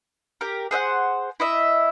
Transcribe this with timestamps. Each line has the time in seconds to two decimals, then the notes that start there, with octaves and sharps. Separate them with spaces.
0.41 G4 A#4
0.71 G#4 C5 E5 F#5
1.40 E4 D#5 E5